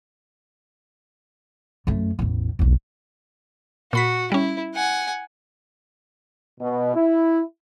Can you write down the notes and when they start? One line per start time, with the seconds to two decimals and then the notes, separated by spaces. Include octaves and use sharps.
1.87 F#2 A3
2.19 A1 E2
2.59 B1 E2
3.93 A#2 F#4 B5 B6
4.32 G3 C#4 E4
4.75 F#5 G#5
6.61 B2
6.95 E4